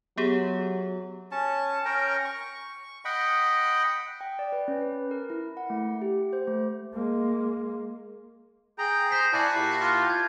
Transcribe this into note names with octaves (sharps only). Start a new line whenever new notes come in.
F#3 B3 G4 G#4
C#4 A5
C#4 A#4 G5 A#5
C#6
D#5 F#5 G5 B5
G5
D5
B4
C#4
B4
A#4
E4
F#5
A3
G4
C5
A3
G#3 A#3
G#4 G5 A#5
C5 G6 B6 C7
E4 F#4 D5 G#5 A5 A6 C7
A#2 E4 G4
F4
G6 G#6